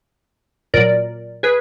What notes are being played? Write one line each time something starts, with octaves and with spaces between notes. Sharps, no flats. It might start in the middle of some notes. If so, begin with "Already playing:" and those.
A#2 F#3 A#4 D5
G#4 B4